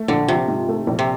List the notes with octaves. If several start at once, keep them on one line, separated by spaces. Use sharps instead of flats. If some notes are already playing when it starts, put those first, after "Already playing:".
Already playing: A3
A#1 D3
C3 F3
G#2
A3
A#1
C3